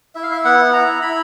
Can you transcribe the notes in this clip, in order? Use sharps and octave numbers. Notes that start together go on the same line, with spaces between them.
E4 E5
F5
E5
B3 F#5
E4 A#5
E4 B5